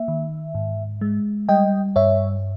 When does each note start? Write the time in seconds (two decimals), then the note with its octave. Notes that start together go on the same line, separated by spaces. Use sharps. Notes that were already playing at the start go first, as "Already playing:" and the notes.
Already playing: A#3 E5
0.08 D#3
0.55 G#2
1.01 G#3
1.49 G3 D#5 G5
1.96 G2 C#5 E5